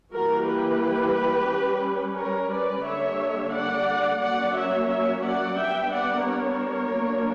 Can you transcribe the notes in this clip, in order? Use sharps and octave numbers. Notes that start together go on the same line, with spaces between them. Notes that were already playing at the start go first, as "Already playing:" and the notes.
E3 G3 A#3 F#4 A#4
G4 B4
G3 C#4
A#4 C#5
B4 D5
D3 G3 A#3 D4 C#5 E5
D5 F#5
F#3 A#3 C#4 D5 F#5
C#5 E5
C#5 E5
D5 F#5
G3 B3 D4 E5 G5
D5 F#5
A#4 C#5
F#3 A#3 D4